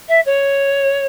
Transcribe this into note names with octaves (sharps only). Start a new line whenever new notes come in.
E5
C#5